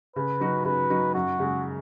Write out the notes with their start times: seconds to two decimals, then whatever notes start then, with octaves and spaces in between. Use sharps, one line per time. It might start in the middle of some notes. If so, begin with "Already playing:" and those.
0.16 C#3 B4
0.40 F#3 D#4 F#4
0.65 C#3 B4
0.90 F#3 D#4 F#4
1.15 F#2 F#4
1.39 C#3 G#3